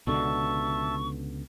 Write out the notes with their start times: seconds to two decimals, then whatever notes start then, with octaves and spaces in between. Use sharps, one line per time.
0.07 C#2 B2 D3 E5 A5 C#6